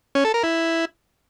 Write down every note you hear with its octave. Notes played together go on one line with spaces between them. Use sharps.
C#4
A4
A#4
E4